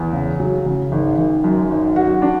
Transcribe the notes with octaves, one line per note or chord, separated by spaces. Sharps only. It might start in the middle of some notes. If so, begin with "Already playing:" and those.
Already playing: E2
C#3
F#3
C#3
G#1
G#1
F#2
G#1
F#4
D4